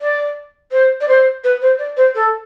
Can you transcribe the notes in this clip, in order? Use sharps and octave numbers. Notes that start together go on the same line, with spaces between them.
D5
C5
D5
C5
B4
C5
D5
C5
A4